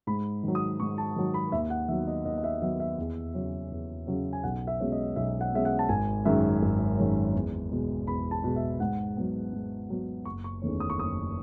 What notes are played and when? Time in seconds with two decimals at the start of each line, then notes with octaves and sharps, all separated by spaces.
0.07 G#2 B5
0.43 D#3 F#3
0.55 D#6
0.80 G#2 C#6
0.98 A5
1.16 D#3 F#3
1.34 B5
1.52 D#2 E5
1.70 F#5
1.88 D#3 F#3 B3 E5
2.07 D#5
2.25 D#2 D#5
2.38 D#5
2.44 E5
2.62 D#3 F#3 B3 E5
2.80 E5
2.98 E2
3.34 C#3 F#3 C#4
3.71 E2
4.07 C#3 F#3 C#4
4.33 G#5
4.43 B1 F#5
4.67 E5
4.80 B2 G#3 C#4
4.92 D#5
5.16 B1 E5
5.41 F#5
5.53 B2 G#3 C#4 E5
5.65 F#5
5.79 A5
5.89 G#1 G#5
6.25 F#2 D#3 G#3 C#4 E5
6.62 G#1
6.98 F#2 D#3 G#3 C#4
7.35 E2
7.72 B2 G#3
8.07 E2 B5
8.31 A5
8.44 B2 G#3
8.56 E5
8.80 G#2 F#5
9.17 F#3 B3
9.53 G#2
9.90 F#3 B3
10.25 F#1 C#6
10.44 C#6
10.62 E2 D#3 A3 C#4
10.80 D#6
10.90 C#6
10.99 F#1 D#6